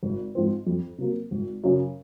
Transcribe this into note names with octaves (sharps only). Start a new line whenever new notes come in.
G#1
G#2 F3 C4
F2
C3 F#3 A#3
G#1
F#2 C#3 F#3